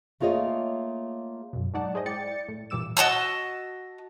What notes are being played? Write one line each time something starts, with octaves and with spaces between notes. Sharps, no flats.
A3 A#3 F4 G#4 C#5 D#5
F#2 B2
G#2 F#3 D#4 D5 F#5 A5
G#3 G#4 C5 D5 D#5
E4 D5 G5 A6 C#7
A2
A#2 E3 G3 D6 E6 E7
F#4 D#5 A5 E6